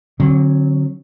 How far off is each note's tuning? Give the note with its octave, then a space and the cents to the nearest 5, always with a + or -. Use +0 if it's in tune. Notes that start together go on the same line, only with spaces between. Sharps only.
D3 +0 F#3 +0 C4 +40